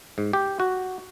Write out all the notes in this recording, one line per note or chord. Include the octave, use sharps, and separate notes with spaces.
G#2
G4
F#4